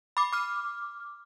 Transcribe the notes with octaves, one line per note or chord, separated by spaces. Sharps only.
B5 D6
D6 F6